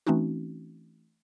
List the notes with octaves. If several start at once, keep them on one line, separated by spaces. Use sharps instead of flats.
E3 A3 C4 C#4 D#4 F#4